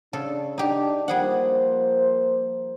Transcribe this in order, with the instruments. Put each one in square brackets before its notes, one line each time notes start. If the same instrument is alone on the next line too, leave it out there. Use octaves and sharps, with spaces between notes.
[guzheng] C#3 A4 [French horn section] D4
[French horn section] D4 [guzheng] D#4 G4
[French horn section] F3 A#3 C5 [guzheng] G3 G#4 F#5